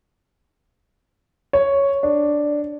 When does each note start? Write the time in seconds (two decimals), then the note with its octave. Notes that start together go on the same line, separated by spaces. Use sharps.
1.53 C#5
2.03 D4